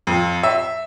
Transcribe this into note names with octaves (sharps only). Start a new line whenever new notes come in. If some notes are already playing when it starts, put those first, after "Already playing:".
F2
E5